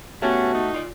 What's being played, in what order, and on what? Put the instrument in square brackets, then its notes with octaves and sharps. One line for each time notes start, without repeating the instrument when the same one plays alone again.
[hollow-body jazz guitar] C2 B3 G4 [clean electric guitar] A3 [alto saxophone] C#4 [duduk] F#4
[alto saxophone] D#4
[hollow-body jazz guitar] F4 D5